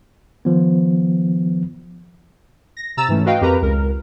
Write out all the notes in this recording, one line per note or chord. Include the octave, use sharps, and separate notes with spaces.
D#3 F3 B3
A#6
C3 A#5 E6 A6 E7
G#2 E3 A3 C#4
F#4 B4 D#5 F5 G5
F2 G4 A#4 B4 A#5
C#2 A#4